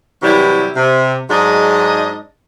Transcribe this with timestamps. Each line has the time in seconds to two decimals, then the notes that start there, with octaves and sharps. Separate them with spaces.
0.23 C3 E3 F#3 G3 E4
0.76 C3
1.30 G#2 F#3 G#3 D4 G#4 D#5